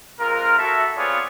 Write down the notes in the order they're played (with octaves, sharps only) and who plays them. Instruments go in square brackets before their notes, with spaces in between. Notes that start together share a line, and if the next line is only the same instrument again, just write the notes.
[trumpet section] G#3 C4 F4 A#4
E4 F#4 A4 E5
B3 C4 F4 G#4 C#5 D5